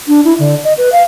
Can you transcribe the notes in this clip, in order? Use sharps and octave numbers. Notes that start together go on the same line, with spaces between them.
D4
E4
D3
D#5
B4
F5